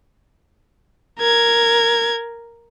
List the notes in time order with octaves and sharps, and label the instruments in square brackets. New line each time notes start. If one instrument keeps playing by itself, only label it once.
[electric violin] A#4 G#6